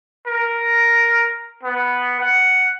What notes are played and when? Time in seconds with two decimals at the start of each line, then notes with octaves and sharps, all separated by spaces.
0.27 A#4
1.63 B3
2.20 F#5